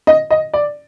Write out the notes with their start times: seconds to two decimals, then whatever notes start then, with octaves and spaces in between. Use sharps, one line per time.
0.07 D#5
0.30 D#5
0.54 D5